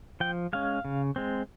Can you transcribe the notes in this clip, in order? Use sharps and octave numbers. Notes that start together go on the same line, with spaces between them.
F3 G5
G#3 C#4 F5
C#3
G#3 C4